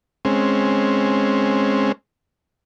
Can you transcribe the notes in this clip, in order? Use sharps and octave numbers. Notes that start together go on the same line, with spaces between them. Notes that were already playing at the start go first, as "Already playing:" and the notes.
G#3 C4 C#4